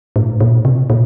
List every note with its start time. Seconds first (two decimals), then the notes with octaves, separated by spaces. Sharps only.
0.16 A2
0.41 A#2
0.65 C3
0.90 A#2